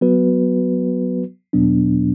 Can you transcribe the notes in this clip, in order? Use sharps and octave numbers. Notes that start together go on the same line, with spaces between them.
F#3 B3 F#4 B4
E2 B2 F#3 B3 D4